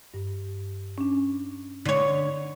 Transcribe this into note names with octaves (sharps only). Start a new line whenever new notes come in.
G2
C#4 D4
D3 C#5